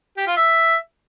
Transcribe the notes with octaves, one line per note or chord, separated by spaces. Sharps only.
G4
F4
E5